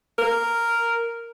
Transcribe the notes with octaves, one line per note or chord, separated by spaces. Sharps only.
A#4